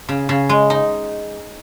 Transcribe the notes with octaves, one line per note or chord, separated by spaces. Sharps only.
C#3
C#3
G#3
D#4